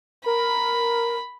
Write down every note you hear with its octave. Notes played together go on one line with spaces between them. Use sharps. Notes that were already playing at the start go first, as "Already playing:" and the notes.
A#4 B5